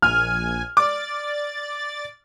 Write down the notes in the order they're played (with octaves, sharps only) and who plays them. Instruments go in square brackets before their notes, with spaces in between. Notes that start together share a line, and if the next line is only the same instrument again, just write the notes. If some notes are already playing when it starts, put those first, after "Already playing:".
[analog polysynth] A#1 G#5 [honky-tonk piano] F6
[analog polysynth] D5 A6 [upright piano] D6